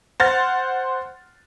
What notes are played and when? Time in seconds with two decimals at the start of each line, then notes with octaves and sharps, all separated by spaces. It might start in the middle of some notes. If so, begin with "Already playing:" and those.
0.20 C5 F#5 C6 F6 A6